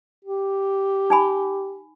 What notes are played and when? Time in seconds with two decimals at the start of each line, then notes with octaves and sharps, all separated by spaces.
0.25 G4
1.10 D#4 G#5 B5